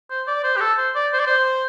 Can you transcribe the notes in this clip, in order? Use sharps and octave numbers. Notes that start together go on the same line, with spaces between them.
C5
D5
C5
G4
A4
C5
D5
C5
D5
C5